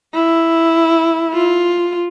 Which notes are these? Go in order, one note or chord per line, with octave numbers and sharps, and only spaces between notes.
E4
F4